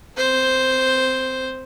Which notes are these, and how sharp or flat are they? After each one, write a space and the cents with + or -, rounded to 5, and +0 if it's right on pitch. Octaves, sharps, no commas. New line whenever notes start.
C4 -20 C5 +0